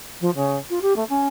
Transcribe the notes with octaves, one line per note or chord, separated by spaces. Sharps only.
F3
C#3
F4
G4
A3
C#4